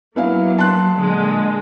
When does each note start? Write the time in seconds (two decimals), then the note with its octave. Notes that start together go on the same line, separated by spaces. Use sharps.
0.16 F#3 A#3 B3 E4 F5
0.58 A5 C6 F#6
0.97 A#2 D3 G#3